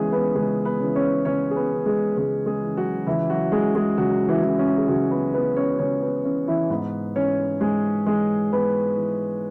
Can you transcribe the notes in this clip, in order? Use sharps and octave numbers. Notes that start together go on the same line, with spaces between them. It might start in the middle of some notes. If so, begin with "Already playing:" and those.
Already playing: C#2 C#3 E3 G#3 B3 C#4 G#4 B4
B3 B4
C#2 G#3 G#4
B3 B4
C#3 E3
C#4 C#5
C#2 C#4 C#5
G#4
B3 B4
C#3 E3
G#3 G#4
C#2 G#3 G#4
G#3 G#4
C#3 E3
F#3 F#4
C#2 E3 E4
F#3 F#4
C#3 E3 G#3 G#4
G#3 G#4
C#2 F#3 F#4
E3 E4
C#3 E3
C#4
G#4
C#2 F#3 F#4
B3 B4
C#3 E3 B3 B4
C#4 C#5
C#2 C#4 C#5
B3
C#3 E3 C#4
E3 E4
G#2 B3 B4
E3 C#4 C#5
G#2 G#3 G#4
E3 G#3 G#4
G#2 B3 B4
E3